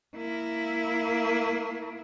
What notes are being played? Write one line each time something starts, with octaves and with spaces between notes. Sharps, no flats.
A#3 E4